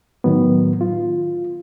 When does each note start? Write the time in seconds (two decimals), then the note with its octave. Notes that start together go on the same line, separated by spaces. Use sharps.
0.24 A2 D#3 F#3 B3
0.81 F4